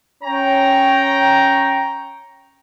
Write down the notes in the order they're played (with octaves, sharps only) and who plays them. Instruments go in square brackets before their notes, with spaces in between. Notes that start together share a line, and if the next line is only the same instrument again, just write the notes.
[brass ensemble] C#4 C#5 G5 A#5